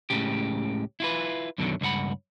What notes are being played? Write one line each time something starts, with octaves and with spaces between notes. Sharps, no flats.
C#2 A2 C#3 G4
E4 F4 B4
F#2 B2 D3 D#3 F#3
C#2 G2 E4 F#5 B5